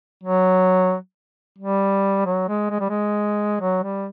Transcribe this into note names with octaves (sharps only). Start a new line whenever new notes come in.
F#3
G3
F#3
G#3
G#3
G3
G#3
F#3
G3